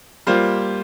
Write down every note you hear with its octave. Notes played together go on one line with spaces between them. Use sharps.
G3 A#3 F4 C5